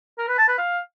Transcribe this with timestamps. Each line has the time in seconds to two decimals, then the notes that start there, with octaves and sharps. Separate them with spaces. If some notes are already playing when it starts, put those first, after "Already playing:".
0.18 A#4
0.28 B4
0.38 A5
0.48 B4
0.58 F5